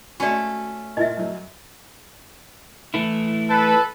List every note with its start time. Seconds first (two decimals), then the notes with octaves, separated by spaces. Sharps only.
0.20 A3 C#4 F#4 D5
0.97 A#2 E4 D#5 E5
1.17 F#2 F#3
2.94 E3 A3 E4
3.49 A4 B4